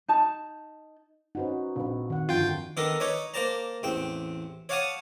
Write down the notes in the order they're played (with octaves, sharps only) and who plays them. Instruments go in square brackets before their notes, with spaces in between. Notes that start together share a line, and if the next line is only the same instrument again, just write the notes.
[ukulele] D#4 A5
[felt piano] C#4 C5 F#5 [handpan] D#4 F#4 B4
[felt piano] A#1 B4 [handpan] C4
[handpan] D#3 F#5
[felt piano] G1 F2 [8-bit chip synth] F4 G5
[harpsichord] D#3 B3 D4 A4 A#4
D#4 B4 C#5 D5
A#3 C5 D5 A5 A#5
A1 E2 C4 G5
C#5 D5 F5 F#5 A5 D#6